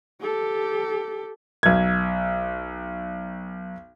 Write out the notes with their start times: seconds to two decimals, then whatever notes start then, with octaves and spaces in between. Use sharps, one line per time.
0.20 G4 A4
1.63 B1 G#6